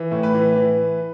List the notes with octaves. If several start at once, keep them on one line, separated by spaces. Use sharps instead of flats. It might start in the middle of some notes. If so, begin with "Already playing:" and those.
Already playing: E3
A2
B4
E3
E3